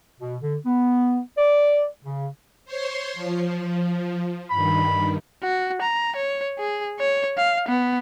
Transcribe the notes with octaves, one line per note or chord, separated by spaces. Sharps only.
B2
D3
B3
D5
C#3
C5 C#5 C6
F3
G2 D#3 B5
F#4
A#5
C#5
G#4
C#5
F5
B3